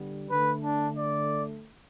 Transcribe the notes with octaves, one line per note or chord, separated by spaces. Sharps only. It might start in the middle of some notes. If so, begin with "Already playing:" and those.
Already playing: D3 G3 B3
D3 A3 B4
D4
D5